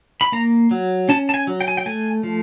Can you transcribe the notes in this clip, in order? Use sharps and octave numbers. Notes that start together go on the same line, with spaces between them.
B5
A#3 A#5
F#3
C#4 A5
A5
G#5
F#3
G5
G#5
G5
A3 G#5
F3